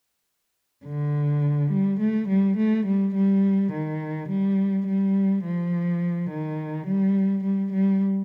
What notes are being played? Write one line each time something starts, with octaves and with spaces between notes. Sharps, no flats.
D3
G3
A3
G3
A3
G3
G3
D#3
G3
G3
F3
D#3
G3
G3
G3